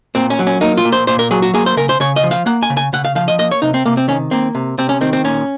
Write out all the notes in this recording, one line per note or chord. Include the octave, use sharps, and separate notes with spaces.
A#2 C4
C#4
F#3
C#4
A#3 D#4
F4
A#2
C5
A#2 C5
A#4
F#3 G#4
F#4
A#3 G#4
C5
C#3 A#4
C5
C#3 C#5
D#5
F3
F5
A#3 F#5
G#5
C#3
G#5
C#3 F#5
F5
F3 F5
D#5
A#3 D#5
C#5
C3 D#4
C4
C3 A#3
C4
D#3 C#4
A#3 C4
C3
C3 C4
C#4
D#3 C4
C4
A#2 C#4